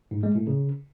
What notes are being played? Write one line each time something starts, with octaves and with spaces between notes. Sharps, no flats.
G#2
G#3
A2
C#3